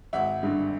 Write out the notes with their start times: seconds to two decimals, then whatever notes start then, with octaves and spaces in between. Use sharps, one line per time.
0.13 G#1 E5 F#5
0.43 G2 D3